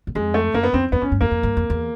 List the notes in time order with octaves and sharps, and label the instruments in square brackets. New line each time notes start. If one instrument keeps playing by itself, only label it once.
[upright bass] F#2
[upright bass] F2 [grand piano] G#3
[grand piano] A3
[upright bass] F#2 [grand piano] A#3
[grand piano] B3
[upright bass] F2 [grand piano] C4
[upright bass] F2 [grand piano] B3
[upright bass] F#2 [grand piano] C#4
[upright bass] G2
[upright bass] F2 [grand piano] A#3
[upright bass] F2
G2
F2
E2